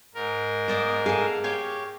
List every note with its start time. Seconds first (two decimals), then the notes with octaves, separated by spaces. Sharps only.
0.15 G#2 A#4
0.68 A#3 C5 D5 D#5
1.06 G#4 A4 F5
1.44 G4 C#5 F5